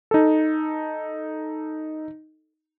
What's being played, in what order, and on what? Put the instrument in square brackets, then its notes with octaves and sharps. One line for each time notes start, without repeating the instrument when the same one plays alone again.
[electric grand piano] D#4 A4